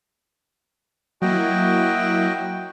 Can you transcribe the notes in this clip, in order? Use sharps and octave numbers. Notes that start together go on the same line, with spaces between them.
F#3 A#3 E4 F#4 D#5 G5